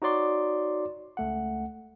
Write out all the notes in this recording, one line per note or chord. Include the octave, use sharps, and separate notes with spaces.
D#4 F#4 C#5 D5 C6 D6
C#2 A3 F#5